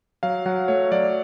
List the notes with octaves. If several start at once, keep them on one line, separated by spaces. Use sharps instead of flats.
F#3 F5
F#3 F#5
A3 C#5
F#3 D5